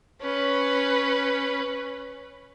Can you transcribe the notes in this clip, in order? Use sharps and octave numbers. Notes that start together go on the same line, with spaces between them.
C#4 B4